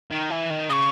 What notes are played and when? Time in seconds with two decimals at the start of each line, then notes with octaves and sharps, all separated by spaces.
0.11 D#3
0.30 E3
0.50 D#3
0.70 C#3 D#6
0.73 C#6